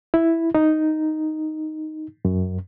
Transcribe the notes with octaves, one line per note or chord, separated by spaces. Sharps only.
E4
D#4
F#2